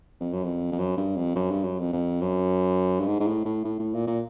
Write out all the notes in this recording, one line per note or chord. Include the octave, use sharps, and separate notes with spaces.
F2
F#2
F2
F2
F#2
G2
F2
F#2
G2
F#2
F2
F2
F#2
G2
G#2
G#2
A2
A2
A2
A2
A#2
A#2